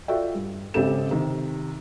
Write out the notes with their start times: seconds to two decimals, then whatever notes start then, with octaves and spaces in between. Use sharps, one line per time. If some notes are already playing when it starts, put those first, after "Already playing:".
0.08 F4 F#4 A4 D5 E5 G5
0.35 G2
0.74 G#1 C#3 C4 G4 A4 E7
1.11 C3 D#3